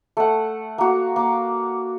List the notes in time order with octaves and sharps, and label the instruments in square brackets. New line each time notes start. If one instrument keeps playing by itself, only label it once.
[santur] A3 F#5
A#3 F#4
A#3 D6